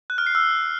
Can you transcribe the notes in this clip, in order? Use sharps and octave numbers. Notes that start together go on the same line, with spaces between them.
F#6
F6
C7
E6